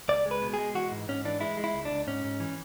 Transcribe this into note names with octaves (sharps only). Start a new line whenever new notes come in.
C#2 D5
G#3
B4
B2
G#3 G#4
E3 F#4
G#2
G#2 C#4
E3 D4
G#3 E4
G#3
E4
C#2
D4
C#2
G#2 C#4
G#2
E3